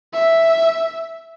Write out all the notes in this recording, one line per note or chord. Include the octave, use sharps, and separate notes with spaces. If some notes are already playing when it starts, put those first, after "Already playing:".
E5